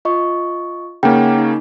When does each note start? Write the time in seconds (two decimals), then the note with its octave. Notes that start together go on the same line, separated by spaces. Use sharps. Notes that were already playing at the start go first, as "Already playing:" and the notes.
0.05 F4 D#5 C#6
1.03 C#3 A#3 C#4 D#4 F#5 G5
1.38 D#4